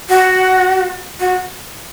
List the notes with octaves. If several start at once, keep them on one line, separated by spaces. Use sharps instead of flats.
F#4
F#4